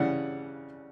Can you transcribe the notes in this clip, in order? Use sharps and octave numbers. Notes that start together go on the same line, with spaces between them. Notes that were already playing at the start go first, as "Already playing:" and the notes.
Already playing: C#3 E3 G3 F#5